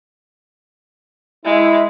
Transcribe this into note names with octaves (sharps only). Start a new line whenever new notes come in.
G#3 E4